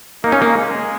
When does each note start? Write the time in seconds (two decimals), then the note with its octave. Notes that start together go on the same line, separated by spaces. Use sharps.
0.24 A#3 D#4
0.32 C#4
0.42 A#3
0.55 G#3